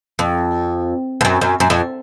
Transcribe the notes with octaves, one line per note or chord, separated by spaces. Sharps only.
F2
F2
F#2
F#2
F#2
F2